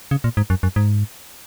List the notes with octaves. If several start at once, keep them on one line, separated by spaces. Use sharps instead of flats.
C#3
A#2
G#2
F#2
F#2
G#2